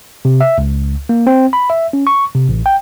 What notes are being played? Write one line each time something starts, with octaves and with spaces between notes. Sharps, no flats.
C3
E5
C#2
A#3
C4
B5
E5
C#4
C#6
C3
A1
G5